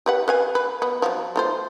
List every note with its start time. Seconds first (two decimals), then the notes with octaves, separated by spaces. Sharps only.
0.06 G4 B4 F#5
0.28 B4 F5 G#5
0.55 B4
0.82 B3
1.02 F3 F#3
1.36 A3 F4 C5